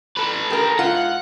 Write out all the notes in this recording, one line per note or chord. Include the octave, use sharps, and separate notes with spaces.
A4 B4
G4 A#4
G#2 F4 F#5